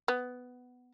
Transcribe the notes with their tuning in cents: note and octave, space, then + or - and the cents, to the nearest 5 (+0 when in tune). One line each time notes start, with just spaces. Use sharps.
B3 +10